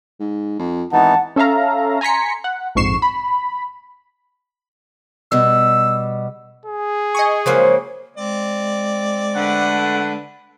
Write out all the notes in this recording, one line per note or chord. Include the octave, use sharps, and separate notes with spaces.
G#2
F2
G#1 E3 B3 D#4 F#5 A5
C#4 A4 E5 F5 A#5
G#5 A#5 C6 B6 C#7
F#5
A#1 F2 G#2 C#6 C7 E7
B5
B2 G3 E6
G#4
D#5 G#5 C#6
C#3 F3 F#3 G#3 A#3 C5
G#3 C4 D5
D3 A3 B4 F#5